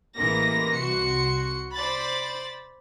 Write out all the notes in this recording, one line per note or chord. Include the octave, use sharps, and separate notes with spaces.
A1 E3 G#3 A#3 A#6
C2 F#4 C6 C#7
C5 D5 B5 A6